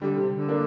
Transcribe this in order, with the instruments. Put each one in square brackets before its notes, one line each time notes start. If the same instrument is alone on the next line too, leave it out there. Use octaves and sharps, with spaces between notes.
[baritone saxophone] D3 [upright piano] G3
[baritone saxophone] C3
D3
[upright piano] A#3 D4